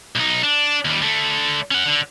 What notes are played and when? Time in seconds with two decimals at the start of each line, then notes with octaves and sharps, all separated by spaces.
0.16 B1 D#4
0.43 D4
0.85 D#2 G3
1.02 D3 A3
1.71 C#4 F#5
1.86 D3